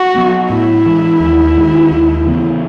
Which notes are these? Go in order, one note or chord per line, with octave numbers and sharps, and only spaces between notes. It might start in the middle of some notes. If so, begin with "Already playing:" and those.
Already playing: F#4
F#3 B3
A2 E4
E3 G#3
D#2
D#3 G#3
D#2
C#3 E3 B3